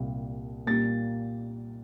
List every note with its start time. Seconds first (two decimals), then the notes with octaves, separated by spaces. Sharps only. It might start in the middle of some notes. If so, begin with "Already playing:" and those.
Already playing: C2 A#2 G3 A#3
0.66 A#2 G3 A#3 A6